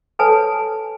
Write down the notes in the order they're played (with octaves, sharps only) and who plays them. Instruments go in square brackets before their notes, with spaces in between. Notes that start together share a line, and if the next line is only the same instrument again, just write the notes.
[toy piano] A4 B4 C#5 G#5 A5 D#6